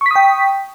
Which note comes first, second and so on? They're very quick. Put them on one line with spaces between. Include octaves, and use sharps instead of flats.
C#6 B6 D#6 G5